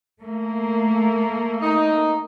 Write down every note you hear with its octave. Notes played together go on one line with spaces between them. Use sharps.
A3 A#3
D#4